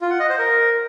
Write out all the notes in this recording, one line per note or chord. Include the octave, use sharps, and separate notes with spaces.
F4
F#5
D#5
C5
A#4